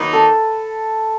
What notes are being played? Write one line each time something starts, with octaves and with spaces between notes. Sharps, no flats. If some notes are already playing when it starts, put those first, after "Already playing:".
Already playing: D#3 F#3 A#3 D#4 B4
A4